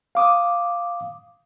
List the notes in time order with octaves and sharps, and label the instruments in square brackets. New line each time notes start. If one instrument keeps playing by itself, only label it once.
[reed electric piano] F5 D6 D#6